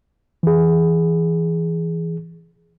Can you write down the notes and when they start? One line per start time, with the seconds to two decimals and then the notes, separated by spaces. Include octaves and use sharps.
0.43 E3 G#4